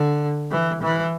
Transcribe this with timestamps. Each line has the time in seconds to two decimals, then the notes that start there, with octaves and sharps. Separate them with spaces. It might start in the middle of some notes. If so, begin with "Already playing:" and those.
Already playing: D3
0.51 E3
0.82 E3